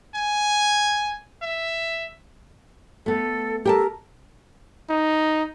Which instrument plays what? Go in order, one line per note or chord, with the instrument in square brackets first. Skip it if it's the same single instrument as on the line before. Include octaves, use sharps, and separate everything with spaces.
[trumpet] G#5
E5
[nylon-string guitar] A3 B3 [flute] A4
[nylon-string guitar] G4 G5 A5 [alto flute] A4 [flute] A#4
[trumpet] D#4